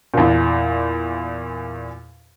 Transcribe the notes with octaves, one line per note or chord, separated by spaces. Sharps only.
E2 A#2